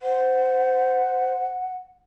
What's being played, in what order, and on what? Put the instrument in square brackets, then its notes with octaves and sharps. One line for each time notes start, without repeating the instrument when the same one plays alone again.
[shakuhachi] C5 [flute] F#5